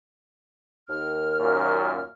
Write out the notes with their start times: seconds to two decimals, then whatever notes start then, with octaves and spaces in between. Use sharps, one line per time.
0.89 D#2 F6
1.39 F#2 A#2